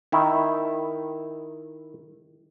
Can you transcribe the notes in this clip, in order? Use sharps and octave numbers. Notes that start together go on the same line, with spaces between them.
D#3 E4